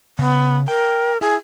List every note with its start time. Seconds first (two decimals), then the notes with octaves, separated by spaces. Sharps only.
0.19 C#3 B3
0.68 A#4 G5
1.21 E4 G#4